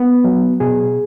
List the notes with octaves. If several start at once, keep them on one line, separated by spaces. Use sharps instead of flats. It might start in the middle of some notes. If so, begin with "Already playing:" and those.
Already playing: B3
F#3
B2 G#4